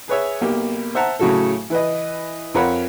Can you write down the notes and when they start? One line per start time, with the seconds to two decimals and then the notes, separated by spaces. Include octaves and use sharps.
0.08 G#4 B4 C#5 E5
0.41 B1 A#3 G4
0.95 C5 E5 F#5 A5 A#5
1.19 A2 C#3 F#3 F#4 A4
1.70 E3 B4 D#5
2.54 F2 F4 A#4 C#5 F#5 B5